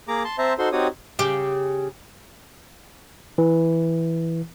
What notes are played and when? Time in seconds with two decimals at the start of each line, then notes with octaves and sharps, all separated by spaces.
0.08 A#3 G#4 A#5 D6
0.24 A5 C6
0.38 C4 C5 E5 A5 A#5
0.59 D#4 F#4 A4 C5 C6
0.72 C4 D#4 F#4 G4 C#5 D#6
1.19 C#3 G4
3.38 E3